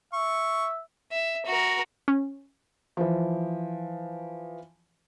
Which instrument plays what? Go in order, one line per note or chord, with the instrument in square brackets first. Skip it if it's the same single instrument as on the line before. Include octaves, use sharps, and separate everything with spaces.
[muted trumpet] E5 [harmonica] C#6
[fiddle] E5
F#4 A#4
[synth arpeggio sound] C#4
[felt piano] E3 F3